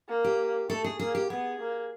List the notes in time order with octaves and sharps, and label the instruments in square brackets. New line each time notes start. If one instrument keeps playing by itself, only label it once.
[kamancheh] A#3
[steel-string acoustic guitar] G4
[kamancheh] A3 [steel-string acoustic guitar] A4
[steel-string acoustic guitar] G#4
[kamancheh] A#3 [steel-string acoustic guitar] G#4
[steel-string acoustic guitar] G4
[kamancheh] B3 [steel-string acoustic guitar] G#4
[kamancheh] A#3